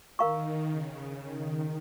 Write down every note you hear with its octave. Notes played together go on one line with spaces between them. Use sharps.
D#3 A#4 F5 A#5 C#6
C#3
D#3